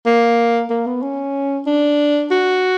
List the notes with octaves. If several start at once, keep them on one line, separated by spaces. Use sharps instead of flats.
A#3
A#3
B3
C#4
D4
F#4